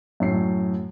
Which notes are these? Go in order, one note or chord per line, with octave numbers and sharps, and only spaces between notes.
F#2 A2 C7